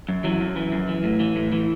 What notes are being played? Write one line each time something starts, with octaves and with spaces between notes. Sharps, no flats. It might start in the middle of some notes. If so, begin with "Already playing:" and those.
F#2
E3 F#3
F#2
E3
F#2
E3
A2
E3
A2
E3